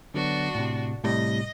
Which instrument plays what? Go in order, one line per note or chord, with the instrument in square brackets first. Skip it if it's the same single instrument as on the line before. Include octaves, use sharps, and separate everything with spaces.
[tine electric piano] D3 F#3 B3 [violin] D4 F#4
[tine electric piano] A2 C3
[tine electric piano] A2 C3 G3 [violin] D#5